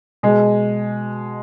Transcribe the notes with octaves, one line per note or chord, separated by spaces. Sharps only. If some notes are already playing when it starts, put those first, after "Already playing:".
B2 G#3 G#4